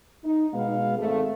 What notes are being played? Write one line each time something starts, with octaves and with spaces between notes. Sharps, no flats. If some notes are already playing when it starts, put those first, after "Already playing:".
D#4
B2 G#3 B3 F5
G#1 A3